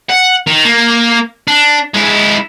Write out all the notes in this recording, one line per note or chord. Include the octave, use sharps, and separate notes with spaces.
F#5
D#3
A#3
D4
G#3 E4